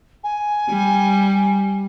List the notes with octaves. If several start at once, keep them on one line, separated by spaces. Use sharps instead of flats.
G#5
G3